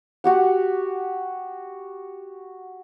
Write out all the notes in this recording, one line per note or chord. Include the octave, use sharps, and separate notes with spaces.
F#4 G4 F#5